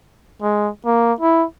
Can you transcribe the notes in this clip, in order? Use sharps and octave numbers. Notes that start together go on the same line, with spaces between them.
G#3
A#3
E4